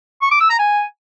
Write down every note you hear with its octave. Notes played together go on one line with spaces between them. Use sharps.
C#6
D6
E6
A#5
G#5